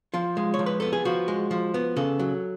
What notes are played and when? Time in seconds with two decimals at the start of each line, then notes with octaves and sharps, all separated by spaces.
0.14 F3 F4
0.37 G#3
0.54 C#5
0.59 F3
0.66 B4
0.80 B3 A4
0.93 G#4
1.05 F3 F#4
1.28 G#3
1.51 F3
1.74 B3
1.96 C#3 A4
2.19 F#3